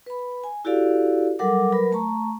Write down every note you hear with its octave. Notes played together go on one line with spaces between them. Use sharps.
B4 B5
G#5
E4 F#4 G4 A4 D5 F5
F#3 G3 A4 A#4 F#5 D6
F#3 A#4 B4 B5
A3 A5 A#5 C#6